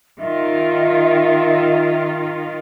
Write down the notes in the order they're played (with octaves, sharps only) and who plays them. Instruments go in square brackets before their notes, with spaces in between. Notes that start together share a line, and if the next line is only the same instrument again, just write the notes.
[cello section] D#3 F4 [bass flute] E5